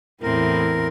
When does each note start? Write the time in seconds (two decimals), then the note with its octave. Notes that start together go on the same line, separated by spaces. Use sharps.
0.23 E2 A2 C4 E4 A#4